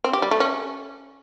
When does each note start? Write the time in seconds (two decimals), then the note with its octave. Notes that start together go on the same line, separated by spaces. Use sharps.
0.04 C4
0.13 G4
0.22 G3
0.31 A3
0.40 C#4